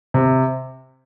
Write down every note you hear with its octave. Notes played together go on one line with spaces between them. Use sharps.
C3